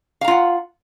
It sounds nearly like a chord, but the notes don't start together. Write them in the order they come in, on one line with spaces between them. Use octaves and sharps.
F5 A#5 F4 F#5